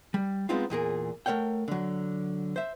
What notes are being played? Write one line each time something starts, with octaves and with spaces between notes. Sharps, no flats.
G3
G#3 B3 C4 D#4 F4
E2 A#2 G#4 A#4
A3 A#4 C#5 F#5 G5
D3 F#3
C5 E5